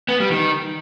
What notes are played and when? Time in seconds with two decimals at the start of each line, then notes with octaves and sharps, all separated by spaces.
0.09 B3
0.20 G3
0.31 D#3